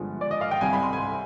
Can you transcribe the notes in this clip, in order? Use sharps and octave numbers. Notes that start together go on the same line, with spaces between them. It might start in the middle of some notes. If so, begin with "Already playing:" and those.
Already playing: G1 G2 D3 F3 G#3
D5
D#5
F5
G5
C2 C3 G3 G#5
B5
C6
G#5